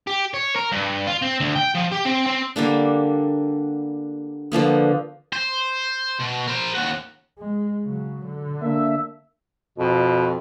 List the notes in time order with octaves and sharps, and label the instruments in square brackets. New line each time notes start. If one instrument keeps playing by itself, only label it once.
[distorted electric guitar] G4
C#5
A#4
G2
F4
C4
D2
G5
F3
G4
C4
C4
[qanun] D3 G3 A#3 D4
D3 F3 A#3 B3
[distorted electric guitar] C5
B2
A#4 C5
D#2 F#4
[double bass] G#3
C#3 F#3
D3
[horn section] A#3 D4 E5
[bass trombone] F2 [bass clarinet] B2